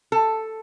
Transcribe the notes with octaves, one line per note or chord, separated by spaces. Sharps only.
A4